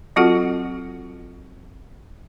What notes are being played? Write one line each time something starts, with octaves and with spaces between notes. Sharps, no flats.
F#3 C4 F4 F#4 A4 F#5